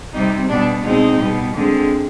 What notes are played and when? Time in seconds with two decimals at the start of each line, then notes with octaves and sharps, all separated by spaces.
0.14 C3 G3 C4 D#4
0.49 B2 G3 B3 D4
0.84 B2 G#3 C4 D#4
1.20 B2 G3 B3
1.55 D3 G#3 C4